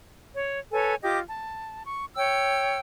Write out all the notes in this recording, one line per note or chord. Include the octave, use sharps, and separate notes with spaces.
C#5
A4 B4 C#5 G#5
F4 G4 D#5 D6
A5
C#6
C#5 G5 E6